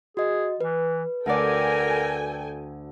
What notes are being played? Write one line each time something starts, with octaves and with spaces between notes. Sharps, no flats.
F#4 G#4 D#5
E3 B4
D2 F#4 A4 A#4 D5 G5 G#5